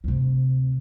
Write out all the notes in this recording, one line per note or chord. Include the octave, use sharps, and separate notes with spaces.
D2 C3